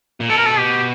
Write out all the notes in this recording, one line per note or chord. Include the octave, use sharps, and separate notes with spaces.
A#2
B2 A4
A#4
A4
G4